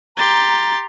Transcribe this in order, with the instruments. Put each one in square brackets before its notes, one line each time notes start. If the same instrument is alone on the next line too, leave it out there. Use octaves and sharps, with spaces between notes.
[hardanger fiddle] G4 [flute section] A#5 [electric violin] C6 A6